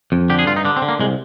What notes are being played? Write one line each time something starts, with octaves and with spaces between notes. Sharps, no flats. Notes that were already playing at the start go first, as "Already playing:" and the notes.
F2
D3 G4
G#4
G2 F4
D#4
D3 D4
C4
D3
A#3
C2 G#3